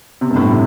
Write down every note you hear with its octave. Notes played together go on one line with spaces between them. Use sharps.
C3
G2
A2
C3